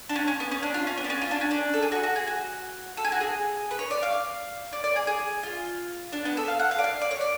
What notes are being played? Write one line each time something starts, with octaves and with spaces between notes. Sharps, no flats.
D4
C#4
C#4
B3
C#4
D4
F4
C#4
B3
D4
C#4
F4
D4
C#4
D4
A4
G#4
F#4
F#4
G#4
F#4
A4
G#4
F#4
G#4
B4
C#5
D5
F5
D5
D5
G#4
G#4
F4
D4
B3
A4
F5
F#5
F5
D5
F5
D5
C#5
D5